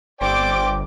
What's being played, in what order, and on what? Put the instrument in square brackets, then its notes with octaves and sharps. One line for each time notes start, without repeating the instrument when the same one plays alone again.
[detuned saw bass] G1 [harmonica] C5 D5 G5 [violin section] D6